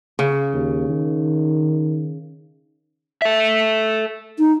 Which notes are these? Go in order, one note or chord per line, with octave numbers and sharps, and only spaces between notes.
C#3
D#2
D#3
A4 E5
D#4